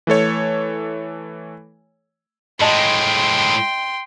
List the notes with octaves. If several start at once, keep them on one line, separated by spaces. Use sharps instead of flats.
E3 A3 A4 C#5
A2 G#3 D#5 G5 A5 C6